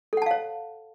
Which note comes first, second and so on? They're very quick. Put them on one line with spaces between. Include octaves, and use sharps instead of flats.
A4 F#5 A5 F5 C#5